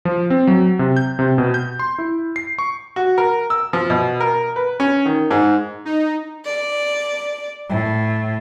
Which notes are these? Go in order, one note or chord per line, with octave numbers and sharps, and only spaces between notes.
F3
C4
F#3
C3
G6
C3
B2
G6
C6
E4
C7
C#6
F#4
A#4
E6
F3
B2
A#4
B4
C#4
D#3
G#2
D#4
D5
A2